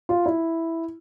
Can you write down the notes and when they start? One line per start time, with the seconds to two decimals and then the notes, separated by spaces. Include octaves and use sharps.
0.09 F4
0.26 E4